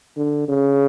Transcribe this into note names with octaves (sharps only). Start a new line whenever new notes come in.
D3
C#3